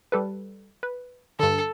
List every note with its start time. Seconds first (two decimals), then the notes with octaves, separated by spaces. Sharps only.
0.12 G3 A4 B4
0.83 B4
1.39 G2 D3 A4